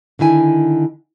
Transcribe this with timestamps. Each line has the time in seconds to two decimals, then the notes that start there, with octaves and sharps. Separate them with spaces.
0.19 D3 D#3 E4 G#5